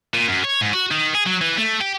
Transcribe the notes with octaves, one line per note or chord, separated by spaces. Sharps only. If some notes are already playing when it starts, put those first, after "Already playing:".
A#2
F#2
C#5
G#2
F#4
D#3
G#4
F#3
E3
A3
G4